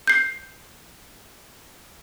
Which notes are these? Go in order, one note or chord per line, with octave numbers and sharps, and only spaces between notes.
G6 C7